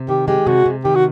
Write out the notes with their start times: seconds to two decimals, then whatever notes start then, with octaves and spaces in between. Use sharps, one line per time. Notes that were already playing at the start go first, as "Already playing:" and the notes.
Already playing: C3
0.08 D#3 G4
0.28 G#3 G4
0.47 C3 F#4
0.66 C3
0.85 D#3 G4
0.95 F#4